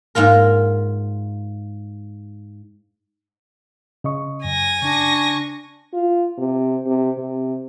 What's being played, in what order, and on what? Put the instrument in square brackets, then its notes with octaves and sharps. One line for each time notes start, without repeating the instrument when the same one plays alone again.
[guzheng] G#2 A#3 F4 A#4
[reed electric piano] C#3 D#5 C#6
[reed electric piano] F#2 [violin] G#5 A#6
[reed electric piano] C#3 [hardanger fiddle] D4 C#6
[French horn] F4
C3
C3
C3